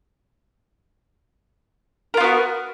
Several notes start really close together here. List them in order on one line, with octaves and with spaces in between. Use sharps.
A#4 F4 B3 F#4